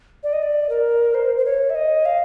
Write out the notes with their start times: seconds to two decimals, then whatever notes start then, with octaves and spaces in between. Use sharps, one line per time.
0.23 D5
0.33 D#5
0.42 D5
0.69 A#4
1.14 C5
1.37 C5
1.45 C#5
1.70 E5
1.75 D#5
2.05 F5